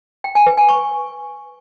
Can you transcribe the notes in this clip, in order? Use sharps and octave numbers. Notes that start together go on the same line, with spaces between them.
G5
G#5
B4
G#5
C#6